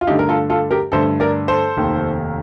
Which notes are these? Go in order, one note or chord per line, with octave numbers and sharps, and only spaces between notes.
F4
G2 D3 A3 D#4 G4
A#4
F4 A4
F4 A4
G4 A#4
G2 D3 A3 A4 C5
A#4 D5
A4 C5
F1 D#2 D#3